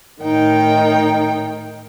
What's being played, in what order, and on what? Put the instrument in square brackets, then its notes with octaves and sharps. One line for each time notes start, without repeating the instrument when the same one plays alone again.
[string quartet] A2 D#3 D#4 G5